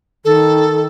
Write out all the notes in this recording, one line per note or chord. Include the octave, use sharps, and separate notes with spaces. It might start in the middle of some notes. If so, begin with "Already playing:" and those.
D#3 A4